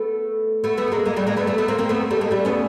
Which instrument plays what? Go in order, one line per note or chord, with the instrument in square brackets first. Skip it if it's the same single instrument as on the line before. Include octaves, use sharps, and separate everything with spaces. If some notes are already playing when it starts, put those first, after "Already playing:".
Already playing: [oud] A3 B3
A3 B3
A3 B3
A3
G#3 A#3
G#3 A#3
G3 A3
G#3 A#3
A3 B3
A3 B3
A3 B3
A#3 C4
A#3 C4
A3 B3
G3 A3
G#3 A#3
G3 A3
B3 C#4